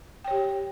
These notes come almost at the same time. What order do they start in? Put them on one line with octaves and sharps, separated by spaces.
G5 C#5 G4